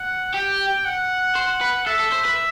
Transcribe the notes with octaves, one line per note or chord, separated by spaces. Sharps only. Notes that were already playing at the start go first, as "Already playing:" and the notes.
Already playing: F#5
G4 G5
F#5
C5
B4
A4 E5
A4
C5
B4